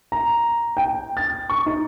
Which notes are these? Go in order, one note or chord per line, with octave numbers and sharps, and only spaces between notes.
A#5
G5
A6
C#6
D#4